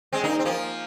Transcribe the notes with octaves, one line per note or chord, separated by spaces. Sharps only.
G#3 C4
A#3 D#4
C4
F3 A#3